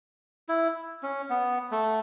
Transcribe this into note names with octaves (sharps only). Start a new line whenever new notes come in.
E4
C#4
B3
A3